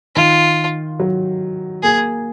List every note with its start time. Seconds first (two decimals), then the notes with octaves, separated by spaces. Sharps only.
0.16 D#3 F4
1.00 F#3
1.83 A#3 G#4